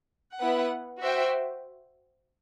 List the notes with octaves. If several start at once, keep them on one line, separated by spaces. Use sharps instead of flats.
B3 E4 B4 F#5
F#4 C5 E5 G5